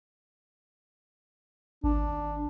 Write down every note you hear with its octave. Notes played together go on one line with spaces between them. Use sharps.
G#1 D4